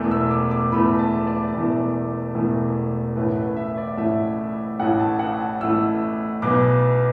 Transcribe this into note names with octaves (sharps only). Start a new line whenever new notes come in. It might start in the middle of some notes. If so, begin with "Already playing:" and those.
Already playing: E1 E2 E3 A3
E6
D6
D6
E1 E2 E3 A3 B5
A5
D5
E1 E2 E3 A3
E1 E2 E3 A3
A1 A2 A3 B4
B4
E5
D5
A1 A2 A3 E5
A1 A2 A3 F#5
A5
F#5
A5
A1 A2 A3 E6
B1 B2 B3 D6